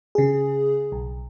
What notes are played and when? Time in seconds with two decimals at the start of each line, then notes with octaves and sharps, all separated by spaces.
0.15 C#3 G#4
0.92 B1